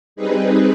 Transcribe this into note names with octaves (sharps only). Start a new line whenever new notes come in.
G3 C4 D#4 G#4 B4